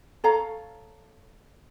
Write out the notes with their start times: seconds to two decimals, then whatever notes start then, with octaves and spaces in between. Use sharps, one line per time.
0.24 A4 C#5 F5 A#5